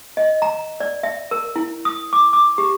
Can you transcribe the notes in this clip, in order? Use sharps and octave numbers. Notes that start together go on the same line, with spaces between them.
D#5
A#5
D5
E5
A#4
E4
D#6
D6
D6
G4